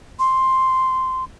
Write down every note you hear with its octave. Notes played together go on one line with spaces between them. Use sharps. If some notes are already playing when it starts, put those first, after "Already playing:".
C6